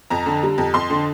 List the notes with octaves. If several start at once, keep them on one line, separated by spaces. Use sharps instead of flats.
F2 A#5
D3
G3
F2
F2 C6
D3